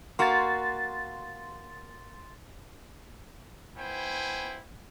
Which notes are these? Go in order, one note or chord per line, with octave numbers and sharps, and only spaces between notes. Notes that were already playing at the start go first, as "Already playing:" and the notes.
A#3 F#4 C6 A6
B3 E4 C5 G5 G#5